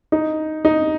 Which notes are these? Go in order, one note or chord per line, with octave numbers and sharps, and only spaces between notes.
D#4
D#4